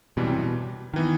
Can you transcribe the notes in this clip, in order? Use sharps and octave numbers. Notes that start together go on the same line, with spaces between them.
F#2 B2 E3 G3
C3
B2
D#3 E3 B3